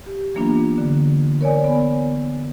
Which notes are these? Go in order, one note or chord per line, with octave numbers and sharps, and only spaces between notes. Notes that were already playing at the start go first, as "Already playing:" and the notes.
G4
E3 F#3 A#3 B3 D4 F4
D3
A#4 C#5 D5 G#5
B3